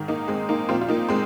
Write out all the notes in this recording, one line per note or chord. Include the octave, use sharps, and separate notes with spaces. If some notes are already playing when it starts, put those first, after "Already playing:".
Already playing: G#2 D#3
A#3 D#4
G#3 C4
A#3 D#4
A#2 F3 C4 F4
F4
A#3 D#4
G#3 C4